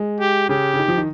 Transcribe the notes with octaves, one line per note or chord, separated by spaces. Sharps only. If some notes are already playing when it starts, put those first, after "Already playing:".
Already playing: G#3
G4
C#3 G4
C#3
D#3
F3
D#3